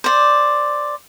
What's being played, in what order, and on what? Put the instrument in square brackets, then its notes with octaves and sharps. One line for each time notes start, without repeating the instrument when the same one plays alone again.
[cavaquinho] C5 D5